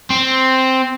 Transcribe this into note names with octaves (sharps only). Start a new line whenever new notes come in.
C4